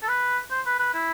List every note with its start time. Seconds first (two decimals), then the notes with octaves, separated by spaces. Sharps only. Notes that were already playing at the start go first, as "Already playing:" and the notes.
0.03 A4
0.08 B4
0.51 C5
0.66 B4
0.79 B4
0.94 E4